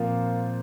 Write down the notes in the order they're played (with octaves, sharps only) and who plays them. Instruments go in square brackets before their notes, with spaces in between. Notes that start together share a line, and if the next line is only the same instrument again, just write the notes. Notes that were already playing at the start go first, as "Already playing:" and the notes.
Already playing: [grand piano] A#2 F3 C4 [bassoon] A#3